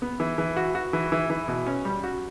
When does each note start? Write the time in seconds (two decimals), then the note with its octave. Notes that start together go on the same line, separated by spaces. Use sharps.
0.02 B3
0.20 E3
0.38 E3
0.57 F#4
0.75 F#4
0.93 E3
1.12 E3
1.30 E3
1.48 B2
1.66 C#4
1.85 G3
2.04 F#4